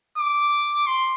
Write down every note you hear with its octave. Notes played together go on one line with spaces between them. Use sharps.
D6
C6